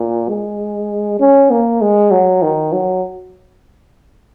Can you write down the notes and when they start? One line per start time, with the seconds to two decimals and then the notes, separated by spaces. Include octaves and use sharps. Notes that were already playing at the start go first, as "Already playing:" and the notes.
Already playing: A#2
0.29 G#3
1.20 C#4
1.50 A#3
1.81 G#3
2.11 F#3
2.42 D#3
2.72 F#3